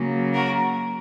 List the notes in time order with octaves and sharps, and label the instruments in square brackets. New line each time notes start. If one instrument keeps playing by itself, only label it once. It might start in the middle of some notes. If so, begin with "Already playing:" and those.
Already playing: [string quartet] C#3 F#3 A#3 C#4
F#4 A#4